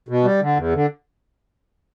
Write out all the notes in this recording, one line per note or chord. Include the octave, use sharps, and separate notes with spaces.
B2
G3
D3
E2
D3